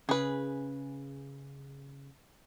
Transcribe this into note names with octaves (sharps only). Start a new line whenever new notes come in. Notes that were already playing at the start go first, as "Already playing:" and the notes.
C#3 G#4 B4